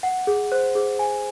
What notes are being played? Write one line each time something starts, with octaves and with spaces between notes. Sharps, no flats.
F#5
G#4
C5
G#4
G#5